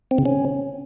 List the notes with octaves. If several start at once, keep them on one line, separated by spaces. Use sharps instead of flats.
C4
C#3
C#4